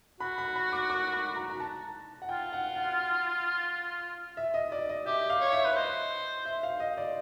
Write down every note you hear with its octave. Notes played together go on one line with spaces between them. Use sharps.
F#4 B5
B5
B5
D6
D6
B5
A#5
A#5
A5
F#5
F4 G5
F#5
F#5
E5
D#5
D5
D#5
G4 E5
F5
C#5
E5
B4
C5 D#5
E5
F5
D#5
D5